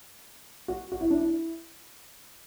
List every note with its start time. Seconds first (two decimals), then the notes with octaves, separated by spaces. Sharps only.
0.68 F#4
0.92 F#4
1.01 E4
1.11 D4
1.20 E4